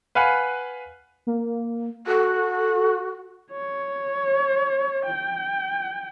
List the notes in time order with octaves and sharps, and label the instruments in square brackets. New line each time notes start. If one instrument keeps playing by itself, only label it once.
[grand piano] B4 F5 F#5 G#5 B5
[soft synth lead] A#3
[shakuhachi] F#4 [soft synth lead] A4
[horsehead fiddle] C#5
G5